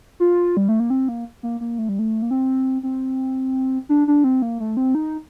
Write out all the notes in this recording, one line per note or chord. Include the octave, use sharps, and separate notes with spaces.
F4
G3
A3
A#3
C4
A#3
A#3
A#3
A3
G3
A3
A#3
C4
C4
D4
D4
C4
A#3
A3
C4
D#4